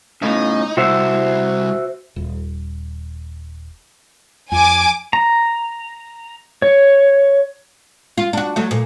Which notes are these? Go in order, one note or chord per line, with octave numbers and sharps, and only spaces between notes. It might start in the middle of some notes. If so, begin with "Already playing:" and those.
A2 C#3 D#4
C2 F#4 C5 E5
D#1
F2 G#5 D6
A#5
C#5
F4
D4 F#4
F#3 A3
A#2